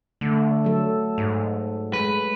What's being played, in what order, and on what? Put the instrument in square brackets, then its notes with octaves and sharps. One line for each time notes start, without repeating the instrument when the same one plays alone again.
[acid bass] D3 [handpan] A3
[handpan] F#3 A4
[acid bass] G#2
[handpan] G#3 [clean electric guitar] B4